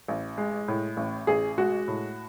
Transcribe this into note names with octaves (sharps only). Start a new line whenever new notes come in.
A1
G#3
A2
A1
A1 G#4
G#3 F#4
A2